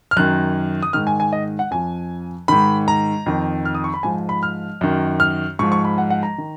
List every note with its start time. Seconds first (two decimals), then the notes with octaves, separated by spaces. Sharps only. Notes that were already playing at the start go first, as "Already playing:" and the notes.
0.11 F6
0.16 F#2 D#3 F#6
0.83 D#6
0.93 G#2 D#3 F6
1.07 G#5
1.20 G#5
1.33 D#5
1.59 F#5
1.71 F2 F3 G#5
2.48 G#2 D#3 B5
2.88 A#5
3.26 F2 D#3
3.65 F6
3.75 D#6
3.84 C#6
3.94 B5
4.03 G#2 F3 G#5
4.29 B5
4.43 F6
4.81 F#2 D#3
5.20 F6
5.59 G#2 F3 C#6
5.72 C#6
5.85 B5
5.98 F#5
6.10 F#5
6.23 A#5
6.38 D#3